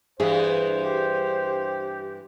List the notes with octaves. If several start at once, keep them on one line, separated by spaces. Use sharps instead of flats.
G2 E3 G#4 C5 E5
G4